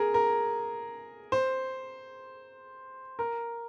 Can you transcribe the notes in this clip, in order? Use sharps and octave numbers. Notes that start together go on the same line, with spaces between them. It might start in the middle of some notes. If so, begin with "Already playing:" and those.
Already playing: G#4 A#4
A#4
C5
A#4